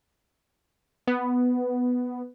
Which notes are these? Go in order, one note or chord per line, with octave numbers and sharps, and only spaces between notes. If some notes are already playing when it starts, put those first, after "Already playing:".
B3